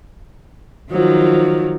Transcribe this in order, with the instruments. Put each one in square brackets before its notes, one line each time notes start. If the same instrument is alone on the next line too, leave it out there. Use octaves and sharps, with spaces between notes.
[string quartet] D#3 F3 F#3